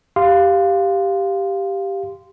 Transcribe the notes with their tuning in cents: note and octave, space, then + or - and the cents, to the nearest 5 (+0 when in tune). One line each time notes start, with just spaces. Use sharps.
G4 +0 F5 +0 C6 -15